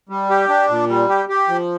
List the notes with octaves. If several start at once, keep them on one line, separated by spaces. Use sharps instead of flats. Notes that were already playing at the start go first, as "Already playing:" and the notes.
G3
G4
D4
A#2
G3
G4
G4
F3